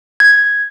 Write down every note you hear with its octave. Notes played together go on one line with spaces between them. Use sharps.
G#6